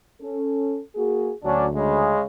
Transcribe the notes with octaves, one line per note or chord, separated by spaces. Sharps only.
C#4 A4
A#3 F#4 G#4
D2 F#3 C#4 D4
C#3 G#3